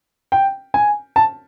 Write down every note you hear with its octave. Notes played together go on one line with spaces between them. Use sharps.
G5
G#5
A5